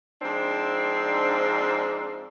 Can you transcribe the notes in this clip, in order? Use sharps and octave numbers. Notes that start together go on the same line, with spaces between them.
G#2 F3 C4 D4